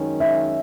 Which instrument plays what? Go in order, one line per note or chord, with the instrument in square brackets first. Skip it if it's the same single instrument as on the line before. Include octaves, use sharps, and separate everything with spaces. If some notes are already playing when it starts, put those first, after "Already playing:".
Already playing: [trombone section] F#2 D#3 G#3 C#4
[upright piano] E5